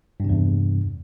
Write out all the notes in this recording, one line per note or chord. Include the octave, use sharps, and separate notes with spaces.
E2 G2 C3